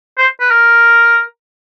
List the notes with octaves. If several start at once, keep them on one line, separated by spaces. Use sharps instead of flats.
C5
B4
A#4